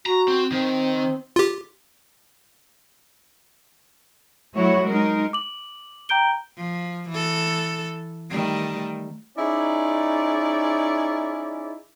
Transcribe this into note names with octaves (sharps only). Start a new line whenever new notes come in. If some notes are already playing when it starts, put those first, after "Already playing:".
F#4 A#5
C4
D#3 C4
F4 G4
F#3 A3 E4 F#4 C#5
G#3 D#4 A#4
D6 F#7
G5 A#5 G6 D7 G7
F3
E3 A4
D#3 G3 A3
C#4 D#4 E4 G#4 D5